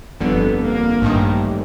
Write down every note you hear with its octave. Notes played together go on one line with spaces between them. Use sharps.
G1 F2 D3 B3
A#3
A1 G2 D#3